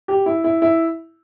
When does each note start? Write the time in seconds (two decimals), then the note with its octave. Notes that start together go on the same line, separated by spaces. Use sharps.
0.08 G4
0.26 E4
0.44 E4
0.62 E4